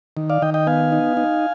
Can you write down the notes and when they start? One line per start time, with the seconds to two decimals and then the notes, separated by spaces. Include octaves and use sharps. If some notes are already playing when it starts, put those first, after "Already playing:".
0.17 D#3
0.30 D5 F5
0.42 D#3 D#5 G5
0.54 D#5 G5
0.67 B3 F5 G#5
0.92 D#4
1.17 D#4